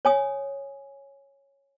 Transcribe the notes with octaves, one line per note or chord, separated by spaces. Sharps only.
C#5 G#5 D#6